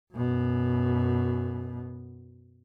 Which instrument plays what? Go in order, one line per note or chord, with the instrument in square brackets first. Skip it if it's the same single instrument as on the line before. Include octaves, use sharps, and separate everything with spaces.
[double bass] F#2 B2